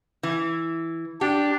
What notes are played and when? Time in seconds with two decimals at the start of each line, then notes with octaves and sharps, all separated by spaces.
0.23 E3
1.21 D4 G4